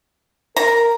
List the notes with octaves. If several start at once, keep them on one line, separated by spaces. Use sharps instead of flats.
A#4 A#5